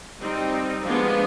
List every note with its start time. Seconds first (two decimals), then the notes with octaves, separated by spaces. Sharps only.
0.21 G3 C4 D#4
0.84 F3 G#3 B3 D4